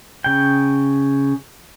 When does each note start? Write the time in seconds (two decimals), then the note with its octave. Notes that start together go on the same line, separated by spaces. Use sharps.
0.24 C#3 G5